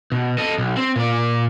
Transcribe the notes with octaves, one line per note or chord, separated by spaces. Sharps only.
B2
A4 D#5
B1
C4
A#2 D5